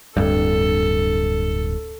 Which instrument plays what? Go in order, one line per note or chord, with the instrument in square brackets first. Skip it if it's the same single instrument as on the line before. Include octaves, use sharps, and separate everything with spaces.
[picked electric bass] D1 G2 [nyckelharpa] A4